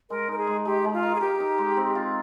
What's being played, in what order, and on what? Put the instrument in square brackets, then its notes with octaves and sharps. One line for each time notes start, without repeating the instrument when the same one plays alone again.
[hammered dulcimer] G#3 [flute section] A#4
[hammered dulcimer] D#4 [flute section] A#4
[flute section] G#4
[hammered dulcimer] G#3
[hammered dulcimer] G#3 [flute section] G4
[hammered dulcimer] G#3
[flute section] F4
[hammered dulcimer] A#4
[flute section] G#4
[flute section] G4 [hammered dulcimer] A#4
[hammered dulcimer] D#4
G#3
C4
F4